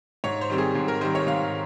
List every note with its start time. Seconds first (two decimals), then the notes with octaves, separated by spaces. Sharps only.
0.24 G#2 C#5
0.41 C5
0.50 D#3 G3 C4
0.58 G#4
0.75 G#2
0.88 A#4
1.01 D#3 G3 C4 C5
1.15 C#5
1.27 G#2 F5